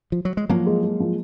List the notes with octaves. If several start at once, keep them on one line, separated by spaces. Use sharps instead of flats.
F3
F#3
G#3
F3 F#3 A#3
G#3
G#3
F3